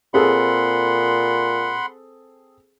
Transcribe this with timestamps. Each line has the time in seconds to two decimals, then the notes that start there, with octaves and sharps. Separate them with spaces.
0.14 A#2 C4 G#4 A4 F#5 B5 C6